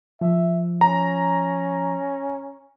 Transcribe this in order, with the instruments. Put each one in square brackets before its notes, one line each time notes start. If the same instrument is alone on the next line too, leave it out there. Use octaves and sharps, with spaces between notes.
[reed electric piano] F3 [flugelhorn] E5
[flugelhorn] C#4 [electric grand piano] A#5